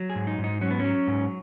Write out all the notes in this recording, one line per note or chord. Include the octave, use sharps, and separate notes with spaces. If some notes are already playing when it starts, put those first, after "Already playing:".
Already playing: F#3
G#4
G#2
D#4
G#2
D#4
F#3 C#4
B3
F#3 C#4
G#2